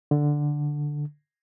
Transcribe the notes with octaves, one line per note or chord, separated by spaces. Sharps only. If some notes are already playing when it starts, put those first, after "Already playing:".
D3